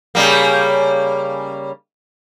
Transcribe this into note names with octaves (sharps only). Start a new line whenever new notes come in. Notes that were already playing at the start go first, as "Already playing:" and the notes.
C#3 G3 A#3